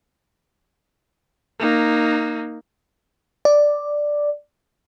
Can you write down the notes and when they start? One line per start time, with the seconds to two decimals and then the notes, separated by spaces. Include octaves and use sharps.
1.60 A#3 D#4
3.45 D5